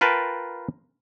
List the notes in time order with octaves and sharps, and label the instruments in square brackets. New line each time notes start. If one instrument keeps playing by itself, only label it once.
[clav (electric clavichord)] F4 A#4 B4 G5 A5